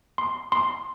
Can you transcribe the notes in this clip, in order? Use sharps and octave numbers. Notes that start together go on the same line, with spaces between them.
C6
C6